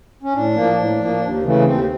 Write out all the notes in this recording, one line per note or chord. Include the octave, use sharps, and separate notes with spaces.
C#4
A2 D4
F3 A#3
A2
F3 A#3
D#2
C#3 E3 A3
D#2 C4